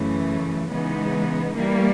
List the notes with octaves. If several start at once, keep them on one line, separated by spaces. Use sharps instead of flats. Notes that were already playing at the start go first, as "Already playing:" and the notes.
Already playing: F#2 C#3 E3 A3
C#3 E3 G#3 B3 D#4
E3 G3 A#3